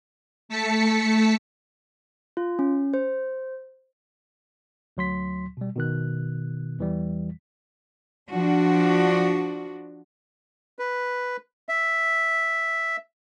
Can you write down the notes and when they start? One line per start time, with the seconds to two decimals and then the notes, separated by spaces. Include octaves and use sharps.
0.49 A3 A5 B6 C#7
2.37 F4
2.59 C#4
2.94 C5
4.97 D2 F#3 C6 B6
5.57 B2 G3
5.76 B2 D#3 F#6
6.79 E2 E3 G3
8.30 F3 D4 F#4
10.79 B4
11.69 E5